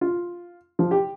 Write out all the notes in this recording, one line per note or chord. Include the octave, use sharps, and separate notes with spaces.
F4
F3
G4